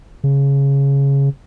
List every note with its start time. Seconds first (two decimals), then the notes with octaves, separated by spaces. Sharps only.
0.24 C#3